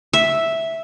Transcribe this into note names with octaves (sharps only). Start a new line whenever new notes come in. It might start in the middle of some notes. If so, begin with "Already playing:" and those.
E5